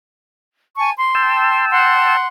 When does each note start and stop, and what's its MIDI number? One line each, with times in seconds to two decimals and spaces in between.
0.77 0.91 80
0.77 0.91 81
0.77 0.91 85
0.97 1.66 84
1.15 2.17 79
1.15 2.17 81
1.15 2.17 88
1.72 2.27 78
1.72 2.27 84